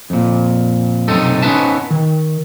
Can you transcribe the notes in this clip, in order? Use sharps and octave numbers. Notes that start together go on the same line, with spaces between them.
F2 A#2
B1 F#2 C3 D#4 A4
B3 C#4 D#4 B4 E5 A5
D#3